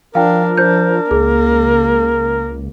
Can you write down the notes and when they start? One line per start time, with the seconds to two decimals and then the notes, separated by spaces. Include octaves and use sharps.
0.15 F3 D4 A#4 F5 G5
0.58 D4 C5 G6
1.11 C#2 A#3 G#4